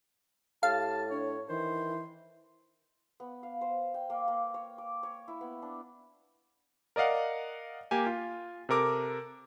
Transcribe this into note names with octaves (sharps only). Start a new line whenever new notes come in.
A2 G4 F5 A5
D4 C#5
D#3 E3 C5
B3
F5
C5
G5
A#3
A#3
C#5
D6
C#5
E4
B3
D4
A#4 D5 D#5 F5 F#5
A#3 G4 G#5
F4
C3 A4 A#4 D6